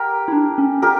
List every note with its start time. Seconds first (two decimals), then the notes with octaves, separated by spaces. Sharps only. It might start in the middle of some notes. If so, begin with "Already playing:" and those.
Already playing: G4 A#4
0.28 E4
0.32 D4
0.58 C#4
0.82 G4 A#4